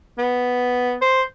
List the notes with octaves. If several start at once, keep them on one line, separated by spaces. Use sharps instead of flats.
B3
C5